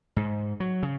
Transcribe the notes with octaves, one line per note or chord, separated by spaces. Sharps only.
G#2
F#3
C#3